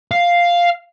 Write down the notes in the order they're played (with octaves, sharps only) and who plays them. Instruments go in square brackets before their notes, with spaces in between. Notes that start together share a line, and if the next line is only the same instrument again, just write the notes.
[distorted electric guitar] F5